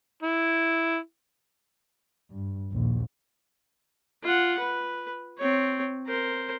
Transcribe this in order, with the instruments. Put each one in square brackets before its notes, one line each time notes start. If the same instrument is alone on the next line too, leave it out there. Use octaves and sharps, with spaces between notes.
[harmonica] E4
[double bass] G2
A#1 D#2
[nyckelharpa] F4 F#5
B4
C4 C#5
A#4 C5